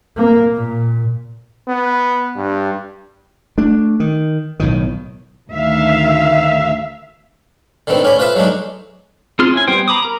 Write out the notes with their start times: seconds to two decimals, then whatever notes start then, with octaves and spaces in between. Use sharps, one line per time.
0.17 A#3
0.55 A#2
1.68 B3
2.36 G2
3.58 A3 D4
4.00 D#3
4.60 B1 A2 D#3
5.51 D2 D#3 E5 F5
7.87 D3 D#3 A3 B3 C4
8.03 A2 C#4 D5 B5
8.19 F4 B4 C5 E5 F5
8.35 F#3 G#3 A3 D4 D#4
9.39 C4 F4 G#4 C6 F6
9.54 C#4 E4 G#5
9.67 G3 B3 C5 G5
9.88 A#5 B5 D6 D#6
10.03 A#4 A#5